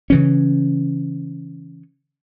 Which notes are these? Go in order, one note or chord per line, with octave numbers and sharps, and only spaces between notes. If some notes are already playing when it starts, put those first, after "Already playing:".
C#3 E3 C#4